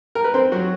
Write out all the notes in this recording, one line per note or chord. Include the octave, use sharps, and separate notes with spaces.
A#4
B4
C4 C5
F#3 F#4